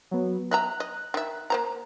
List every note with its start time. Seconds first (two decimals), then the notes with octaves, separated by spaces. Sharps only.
0.11 F#3 B3
0.51 D#5 E5 A#5 F#6
0.80 D#5
1.14 D#3 E5
1.50 A#3 C5 A#5